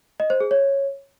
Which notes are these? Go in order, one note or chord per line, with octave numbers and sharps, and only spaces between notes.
D#5
C5
G#4
C#5